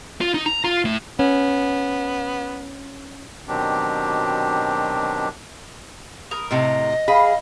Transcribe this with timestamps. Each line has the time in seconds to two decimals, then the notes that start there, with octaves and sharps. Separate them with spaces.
0.21 F4
0.34 D#4
0.46 A#5
0.64 F4
0.85 A2
1.19 B3 C#4
3.48 B2 D#3 F#3 C4 D4 G4
6.31 A#4 D#6
6.51 A2 C3 D#5
7.08 G#4 F5 B5